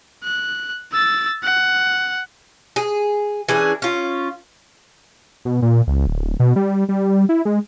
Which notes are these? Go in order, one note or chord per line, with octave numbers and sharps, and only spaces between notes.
F#6
E6 A6
F#5
G#4
E3 C#4 D4 G#4
C#4 F4
B2
A#2
C#2
D1
B2
G3
G3
E4
G#3